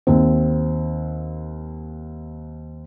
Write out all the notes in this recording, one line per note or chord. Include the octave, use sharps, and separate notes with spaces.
D#2 C4